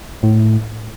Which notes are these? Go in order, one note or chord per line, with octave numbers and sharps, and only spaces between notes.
A2